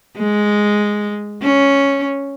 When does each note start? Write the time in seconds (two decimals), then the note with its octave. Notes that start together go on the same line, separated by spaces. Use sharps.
0.17 G#3
1.42 C#4